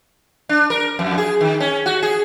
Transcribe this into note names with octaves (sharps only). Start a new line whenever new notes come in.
D4
A#4
F2
G#4
D#3
C#4
F#4
G#4